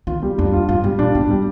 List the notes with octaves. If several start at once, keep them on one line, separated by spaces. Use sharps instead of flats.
D#3 F4
G3
F2 D4
F4
G2 F4
G#2 G3
A#2 D4
G#2 G3
G3